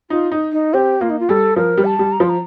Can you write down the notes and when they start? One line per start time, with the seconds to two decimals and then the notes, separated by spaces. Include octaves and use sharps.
0.10 D#4 F4
0.32 D#4
0.52 D#4
0.74 C4 G4
1.01 A#3 F4
1.10 D#4
1.20 F4
1.29 G3 A4
1.56 F3 A#4
1.77 G3
1.85 A5
1.99 G3
2.12 A#5
2.20 F3 C6
2.29 A#5